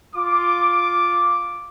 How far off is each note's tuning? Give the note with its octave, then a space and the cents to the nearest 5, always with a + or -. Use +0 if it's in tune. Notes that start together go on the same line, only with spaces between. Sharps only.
F4 +5 D6 +0